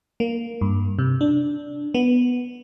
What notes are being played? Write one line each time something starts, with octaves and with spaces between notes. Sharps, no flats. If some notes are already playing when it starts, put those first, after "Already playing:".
A#3
G2
C3
D4
B3